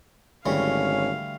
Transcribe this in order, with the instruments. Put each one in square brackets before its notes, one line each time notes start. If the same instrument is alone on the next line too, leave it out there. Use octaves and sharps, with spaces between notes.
[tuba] G#1 [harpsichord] D2 E3 G3 [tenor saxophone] C#4 [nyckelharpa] F5